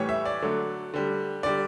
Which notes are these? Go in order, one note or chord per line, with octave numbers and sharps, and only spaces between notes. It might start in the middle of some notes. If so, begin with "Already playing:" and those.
Already playing: A2 E3 G3 C#5
E5
D5
D3 F#3 A3
D3 G3
D3 G3 D5